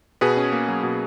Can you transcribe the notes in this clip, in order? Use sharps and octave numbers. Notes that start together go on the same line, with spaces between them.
B2 G#4 B4
C#4
A#3
F#3
B2